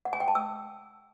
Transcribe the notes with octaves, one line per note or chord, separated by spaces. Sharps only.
F#5
G#5
G5
A5
E6